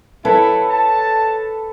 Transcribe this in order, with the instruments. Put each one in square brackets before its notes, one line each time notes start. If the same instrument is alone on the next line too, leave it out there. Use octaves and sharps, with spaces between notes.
[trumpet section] E4 [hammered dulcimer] A4 B4 C#5
[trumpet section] A5